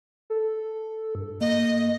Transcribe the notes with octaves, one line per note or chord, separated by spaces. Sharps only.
A4
G2
A#3 D#5